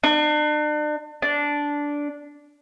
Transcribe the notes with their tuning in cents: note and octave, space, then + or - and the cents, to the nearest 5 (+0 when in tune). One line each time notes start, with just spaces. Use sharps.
D4 +40
D4 -10